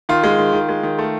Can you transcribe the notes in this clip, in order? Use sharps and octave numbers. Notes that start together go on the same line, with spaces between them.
D#3 F4
G#3
D#3
D#3
G#3
D#3
A3